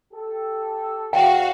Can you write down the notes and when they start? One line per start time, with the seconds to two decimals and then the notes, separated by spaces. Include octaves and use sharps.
0.14 G4 A4
1.13 E2 F#4 F5 G5